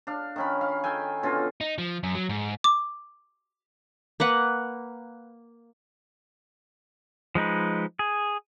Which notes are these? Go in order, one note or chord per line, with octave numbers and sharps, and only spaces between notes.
D4 F5
D#3 C#4 B5
F5
A4 G5 G#5
B2 D3 C#4 F4
D#4
F3
F#2
F#3
G#2
D6
A#3 B4 F#5
F3 G#3 D#4 B4
G#4